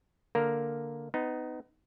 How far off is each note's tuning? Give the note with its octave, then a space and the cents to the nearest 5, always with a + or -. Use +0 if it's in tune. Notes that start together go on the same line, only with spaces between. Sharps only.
D3 +0 A#3 +0 A#4 +0
B3 +30 D#4 +0